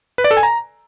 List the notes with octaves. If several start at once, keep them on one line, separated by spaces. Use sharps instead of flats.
B4
D5
A4
G#5
A#5